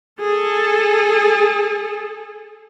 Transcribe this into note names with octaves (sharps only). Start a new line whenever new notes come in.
G#4 A4